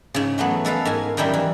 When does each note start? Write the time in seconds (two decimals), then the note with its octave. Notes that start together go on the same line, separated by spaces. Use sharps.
0.14 G#2 C#3
0.38 E3 F#3 A3 B3
0.65 G#3 A4 B4 F5
0.85 G#2 A#4 G#5
1.17 F#2 D#3 G3 E4 A#4
1.34 E3